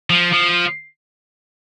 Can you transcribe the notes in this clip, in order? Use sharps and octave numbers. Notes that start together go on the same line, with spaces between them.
F3
F3